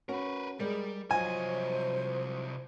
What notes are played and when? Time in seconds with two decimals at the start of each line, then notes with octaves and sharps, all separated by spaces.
0.09 C#4 F#4 A#4 B4
0.60 G3 G#3 A#4 D5
1.11 C2 F3 F#3 F4 C5 D#5 G#5